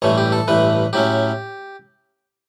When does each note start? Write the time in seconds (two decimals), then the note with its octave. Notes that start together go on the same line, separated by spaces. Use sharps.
0.02 A1 G2 E3 A3 C#5
0.18 G4
0.32 A4
0.48 A1 G2 E3 A3 B4
0.93 A2 F#3 C#4 G4